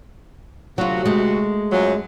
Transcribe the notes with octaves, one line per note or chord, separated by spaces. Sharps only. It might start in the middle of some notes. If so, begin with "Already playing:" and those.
D2 C3 F#3 F4 F#4
G#3 A3
F#2 F3 F#3